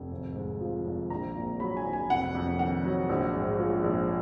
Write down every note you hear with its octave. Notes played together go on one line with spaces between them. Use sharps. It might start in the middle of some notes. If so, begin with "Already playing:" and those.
Already playing: F1
G#1
G#2
F3
G#1
A#1 A#5
A#2
F#3 B5
G#5
A#1
G#5
F1 F#5
F2
D#3 F#5
F#3
A#1
G#2
F3
A#1